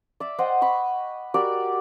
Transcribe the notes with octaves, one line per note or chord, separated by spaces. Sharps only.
D5 E5
C5 D#5 F#5 G5
B5 C#6
F#4 G4 A#4 D5